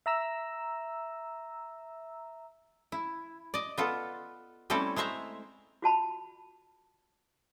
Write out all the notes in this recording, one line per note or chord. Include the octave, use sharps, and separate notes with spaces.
E5 A#5 E6
E4
D5 D#5
B3 F4 A4
G3 A3 C4 C#4 E4 A4
G#3 A3 C5 E5 A#5
F4 F#4 A5 B5